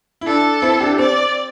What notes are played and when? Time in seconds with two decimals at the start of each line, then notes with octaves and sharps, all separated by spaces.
0.21 E4
0.27 D4 A4
0.62 C4 E4
0.80 D4 G4
0.98 C4 D5